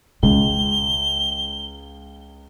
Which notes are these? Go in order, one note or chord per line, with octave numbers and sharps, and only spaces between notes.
C#2 G#3 G7